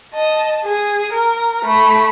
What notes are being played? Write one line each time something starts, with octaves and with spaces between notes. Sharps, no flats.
D#5 A5
G#4
A#4
A3 B5